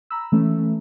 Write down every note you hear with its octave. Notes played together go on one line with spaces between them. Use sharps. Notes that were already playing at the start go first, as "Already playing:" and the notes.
A#5 B5 E6
E3 A3 C#4